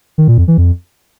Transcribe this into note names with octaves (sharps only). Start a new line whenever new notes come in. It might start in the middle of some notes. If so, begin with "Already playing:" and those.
D#3
A#2
F2
E3
F2